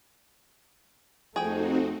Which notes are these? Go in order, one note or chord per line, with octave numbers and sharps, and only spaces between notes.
F2 F3 A3 C4 D#4 F#4 G#4 G5